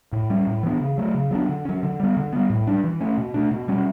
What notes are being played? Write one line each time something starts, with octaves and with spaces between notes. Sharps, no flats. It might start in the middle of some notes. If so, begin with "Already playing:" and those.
A2
G3 C#4
A2
E3 B3 D4
C#3
F#3 A3
C#3
F#3 B3 D4
D3
F#3 C#4
D3
G3 B3
D3
G3 B3
A2
G3 D4
E3
A3 C#4
B2
A3 D4
B2
G3 C#4